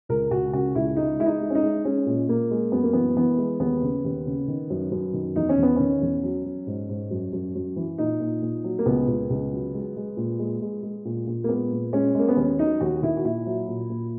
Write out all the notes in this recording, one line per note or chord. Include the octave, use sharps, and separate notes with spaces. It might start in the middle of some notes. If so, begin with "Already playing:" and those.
C#2 A#4
C#2 F#4
C#3 F#4
C#2 E4
G#3 D#4
G#3 E4
D#4
G#3
C#4
D#4
G#3
G#3 C#4
A#2
A#2 A#3
G#3
F#2 B3
A#3
E3 B3
E3 B3
G#3
D#2 B3
C#3
D#2
C#3
D#3
F#2
F#2
D#3
E2 D#4
C#4
E2
B3
D#3 C#4
E2
F#3
F#3
G#2
G#2
F#2
F#2
F#2
E3
A#2 D#4
A#2
A#2
F#3
A#3
C#2 B3
C#2
C#2
F#3
G#3
G#3
A#2
G#3
G#3
G#3
A#2
A#2
A#3
G#3 B3
A#2
G#3 C#4
G#3 A#3
B3
D#2 C#4
F#3 D#4
D#2 F#4
D#3 E4
F#4
A#2 E4
F#3
A#2
A#2